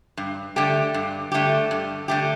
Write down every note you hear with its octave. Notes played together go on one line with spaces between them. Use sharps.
G2
D3 A3 G4
G2
D3 A3 G4
G2
D3 A3 G4